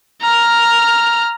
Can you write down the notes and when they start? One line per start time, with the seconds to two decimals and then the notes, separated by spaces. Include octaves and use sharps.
0.22 A#5 F6